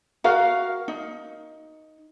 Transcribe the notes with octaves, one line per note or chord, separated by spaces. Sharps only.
F#4 A#4 F5
D#4